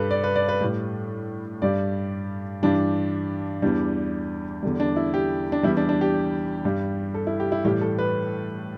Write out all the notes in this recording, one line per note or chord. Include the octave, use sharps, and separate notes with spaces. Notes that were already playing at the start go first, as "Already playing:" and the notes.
Already playing: G2 G3 A4 B4
D5
B4
D5
B4
A2 G3
G2 G3 D5
G2 E3 G3 D4
E2 E3 G3 D4
E2 D3 G3
D4
E4
G4
D4
E2 E3 G3 E4
D4
D4
G4
G2 G3
A4
E4
G4
E4
A2 E3 G3 G4
A4
B4